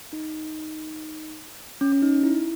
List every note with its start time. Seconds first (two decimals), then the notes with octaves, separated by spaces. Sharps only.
0.13 D#4
1.81 C#4
1.92 C#4
2.02 D#4
2.23 E4